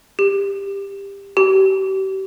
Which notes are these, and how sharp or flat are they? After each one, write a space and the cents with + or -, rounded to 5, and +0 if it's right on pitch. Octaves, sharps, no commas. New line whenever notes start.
G4 +20
G4 -35